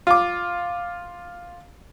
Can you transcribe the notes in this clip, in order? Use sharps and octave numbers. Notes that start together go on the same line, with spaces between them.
F4 D6